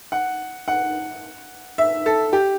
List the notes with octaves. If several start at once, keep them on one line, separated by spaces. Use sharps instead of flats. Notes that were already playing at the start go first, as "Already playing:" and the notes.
F#5
F#5
E5
A4
G4